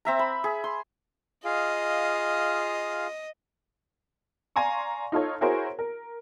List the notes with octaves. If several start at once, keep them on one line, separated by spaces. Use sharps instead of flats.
C4 E5 A#5
B5
G#4
C6
F4 G#4 D#5 F5
D5 F5 G#5 A#5 C6 C#6
D#4 F4 A4 C#5
E4 F#4 G#4 A#4 C5 C#5
A#4